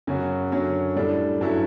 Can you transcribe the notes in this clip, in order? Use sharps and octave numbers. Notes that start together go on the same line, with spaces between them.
F#2 C#3 F#3 C#4 F#4
F#2 D3 F#3 C#4
A2 G3 D4 A4
G2 F#3 C#4 E4 A4